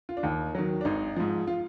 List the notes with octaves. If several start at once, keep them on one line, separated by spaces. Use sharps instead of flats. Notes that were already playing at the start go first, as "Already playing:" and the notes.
F4
D4
D#2 D#4
D#3 F#3
D4
G#1 D#4
G#2 F3
F4